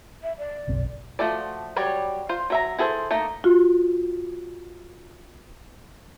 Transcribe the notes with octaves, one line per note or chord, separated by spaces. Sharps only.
E5
D5
F#1 B1 C4
F3 A3 F#4 A4 D5
F#3 G3 C#5 D5
F4 C5
F#3 E5 A#5
E4 G#4 A4 B4 C5
A3 A#3 D#4
F4 F#4